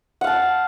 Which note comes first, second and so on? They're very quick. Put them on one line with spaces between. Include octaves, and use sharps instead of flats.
F#5 F5 A5